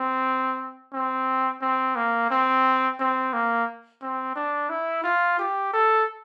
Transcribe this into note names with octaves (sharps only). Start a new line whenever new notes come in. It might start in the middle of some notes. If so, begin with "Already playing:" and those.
Already playing: C4
C4
C4
A#3
C4
C4
A#3
C4
D4
E4
F4
G4
A4